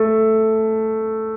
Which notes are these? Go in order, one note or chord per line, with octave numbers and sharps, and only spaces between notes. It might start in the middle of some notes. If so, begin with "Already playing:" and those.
Already playing: A3